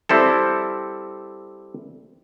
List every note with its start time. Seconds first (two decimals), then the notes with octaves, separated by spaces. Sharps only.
0.09 G3 C4 E4 A4